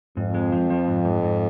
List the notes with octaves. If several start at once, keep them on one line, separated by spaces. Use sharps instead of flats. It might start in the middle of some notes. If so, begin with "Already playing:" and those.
F2 G#2
G#3
F3
F3
G#2
G#2
G#2